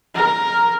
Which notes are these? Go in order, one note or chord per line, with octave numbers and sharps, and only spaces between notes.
A#4